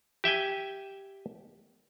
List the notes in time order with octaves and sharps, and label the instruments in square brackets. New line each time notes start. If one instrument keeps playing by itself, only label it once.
[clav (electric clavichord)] G4 E5 G5 G#5